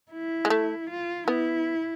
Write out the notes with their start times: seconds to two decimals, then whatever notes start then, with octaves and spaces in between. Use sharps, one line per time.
0.12 E4
0.45 G#3
0.50 A3
0.90 F4
1.27 B3 E4